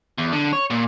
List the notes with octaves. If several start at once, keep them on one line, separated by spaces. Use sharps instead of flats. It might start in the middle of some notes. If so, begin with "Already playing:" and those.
E2
D3
C#5
A#2